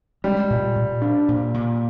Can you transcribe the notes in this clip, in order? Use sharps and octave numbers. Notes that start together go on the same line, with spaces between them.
G3 G#3
A#2
A#2
D4
A#2
A#2